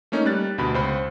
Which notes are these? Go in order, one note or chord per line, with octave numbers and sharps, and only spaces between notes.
A3 A#3 C#4 D#4
G3 F#6 A6
D2 B2 B5
C#2 C5 B5